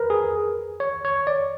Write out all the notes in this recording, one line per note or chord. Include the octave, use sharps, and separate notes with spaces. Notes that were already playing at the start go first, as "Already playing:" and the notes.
Already playing: A#4 B4
G#4
C#5
C#5
D5